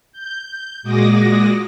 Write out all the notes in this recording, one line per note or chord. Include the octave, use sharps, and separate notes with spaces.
G6
A#2 G#3 F#4 D6 D#6 A#6